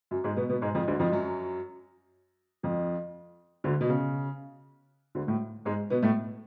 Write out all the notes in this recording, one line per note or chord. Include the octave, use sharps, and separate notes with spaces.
F#2 F#3
G#2 G#3
B2 B3
B2 B3
G#2 G#3
F2 F3
D2 D3
F2 F3
F#2 F#3
F2 F3
D2 D3
B2
C#3
D2 D3
A2 A3
G#2 G#3
B2 B3
A2 A3